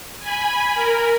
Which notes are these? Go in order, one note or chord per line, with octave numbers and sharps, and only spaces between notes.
G#5 B5
A#4